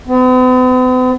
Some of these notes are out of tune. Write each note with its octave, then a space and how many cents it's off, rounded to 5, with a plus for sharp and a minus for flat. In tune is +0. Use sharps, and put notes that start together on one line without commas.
B3 +45